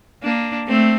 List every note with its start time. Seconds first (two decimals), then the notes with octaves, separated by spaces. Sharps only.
0.23 A#3 D4
0.68 A3 C4